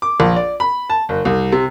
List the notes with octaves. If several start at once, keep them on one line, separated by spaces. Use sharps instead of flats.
D6
A#1
D5
B5
A5
F#1
C2
C3